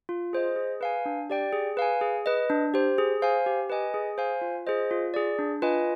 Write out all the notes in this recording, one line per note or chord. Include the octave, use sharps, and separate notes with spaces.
F4
G#4 C5 D#5
G#4
B4 F5 G#5
D4
G4 D5 G5
G#4
B4 F5 G#5
G#4
B4 D#5
D4
G4 C5
G#4
C5 F5 G#5
G4
B4 D#5 G#5
G#4
C5 F5 G#5
F4
G#4 C5 D#5
F4
G#4 D5
D4
F4 B4 D#5 G#5